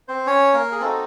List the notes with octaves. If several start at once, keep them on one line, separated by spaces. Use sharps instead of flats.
C4 C5
C#4 C#5
A#3 A#4
G#4
C4 D#4 F#4 A4